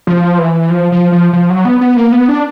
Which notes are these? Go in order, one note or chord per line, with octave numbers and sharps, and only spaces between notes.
F3
E3
F3
F3
F3
F3
F#3
B3
B3
A#3
B3
D4